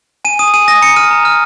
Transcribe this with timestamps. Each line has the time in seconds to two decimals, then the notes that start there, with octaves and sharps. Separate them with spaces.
0.25 G#5 D#7
0.39 D#6 D#7
0.54 G#5 D#7
0.68 D#6 A#6
0.82 A#5 C#7
0.96 F6 D#7
1.11 A#5
1.25 F6